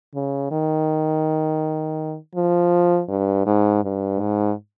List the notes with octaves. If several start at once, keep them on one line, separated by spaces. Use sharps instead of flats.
C#3
D#3
F3
G2
G#2
G2
G#2